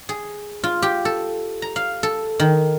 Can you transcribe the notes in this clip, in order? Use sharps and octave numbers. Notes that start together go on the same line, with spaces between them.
G#4
F4
G4
A4
A#5
F5
A4
D#3